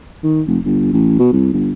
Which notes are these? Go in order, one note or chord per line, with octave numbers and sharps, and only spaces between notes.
D#3
F1
G1
A1
B2
C2
G1